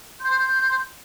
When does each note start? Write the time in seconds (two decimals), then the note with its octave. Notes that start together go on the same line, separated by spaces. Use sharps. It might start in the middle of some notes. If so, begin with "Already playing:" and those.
0.21 C6 G6